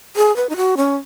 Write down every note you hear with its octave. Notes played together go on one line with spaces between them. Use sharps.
G#4
B4
D#4
F#4
C#4